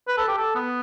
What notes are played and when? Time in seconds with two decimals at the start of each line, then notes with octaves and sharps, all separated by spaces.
0.08 B4
0.17 A4
0.28 G4
0.37 A4
0.55 B3